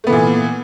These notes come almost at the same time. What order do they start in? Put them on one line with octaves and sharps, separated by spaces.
A3 B3 E3 A#2